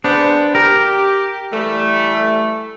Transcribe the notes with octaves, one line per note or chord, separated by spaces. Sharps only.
B3 D4 G#4 C5
G4 A#4
E3 G3 A3